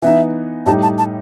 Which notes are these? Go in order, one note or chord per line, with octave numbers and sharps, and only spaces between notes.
E3 B3 D#4 E5
A2 G3 D#4 G4 A5
A5
A5